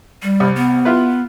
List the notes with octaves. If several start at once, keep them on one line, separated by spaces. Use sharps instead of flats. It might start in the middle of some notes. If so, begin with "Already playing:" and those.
G3
C2
B3
E4 F4 B4